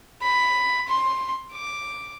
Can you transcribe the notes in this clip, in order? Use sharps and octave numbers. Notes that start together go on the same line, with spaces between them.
B5
C6
D6